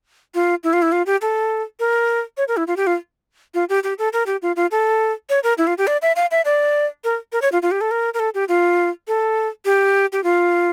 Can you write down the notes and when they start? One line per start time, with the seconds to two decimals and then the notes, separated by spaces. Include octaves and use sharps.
0.35 F4
0.64 E4
0.73 F4
0.82 E4
0.92 F4
1.06 G4
1.22 A4
1.80 A#4
2.37 C#5
2.48 A#4
2.57 E4
2.67 F4
2.77 G4
2.87 F4
3.54 F4
3.69 G4
3.83 G4
3.99 A4
4.13 A#4
4.26 G4
4.42 F4
4.56 F4
4.71 A4
5.30 C#5
5.43 A#4
5.58 E4
5.67 F4
5.78 G4
5.87 D5
6.02 E5
6.16 F5
6.31 E5
6.45 D5
7.04 A#4
7.32 A#4
7.42 C#5
7.52 F4
7.62 F4
7.71 G4
7.81 A4
7.91 A#4
8.14 A#4
8.19 A4
8.34 G4
8.49 F4
9.08 A4
9.65 G4
10.12 G4
10.24 F4